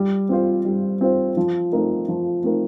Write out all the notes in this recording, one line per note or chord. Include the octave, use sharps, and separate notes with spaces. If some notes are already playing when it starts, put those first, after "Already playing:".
Already playing: G3
C4 F4 C5
G3
C4 F4 C5
F3
A3 C4 D#4 A#4
F3
A3 C4 D#4 A#4